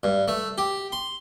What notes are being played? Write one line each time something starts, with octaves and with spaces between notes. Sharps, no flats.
G2
A3
G4
C6